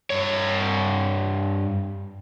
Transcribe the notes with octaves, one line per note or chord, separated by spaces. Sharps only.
G2 C#5